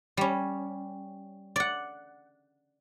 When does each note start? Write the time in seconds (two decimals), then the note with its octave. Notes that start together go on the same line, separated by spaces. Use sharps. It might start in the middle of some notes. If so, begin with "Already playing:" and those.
0.17 G3 C#4
1.56 D5 F#5